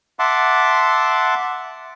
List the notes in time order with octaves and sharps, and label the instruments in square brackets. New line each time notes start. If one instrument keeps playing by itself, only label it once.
[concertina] E5 F#5 A5 C6 D6